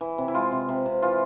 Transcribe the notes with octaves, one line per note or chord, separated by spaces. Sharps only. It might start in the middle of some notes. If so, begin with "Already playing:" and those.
E3
C3
E4
G#3 F4
C3
C3
C3
E3 F4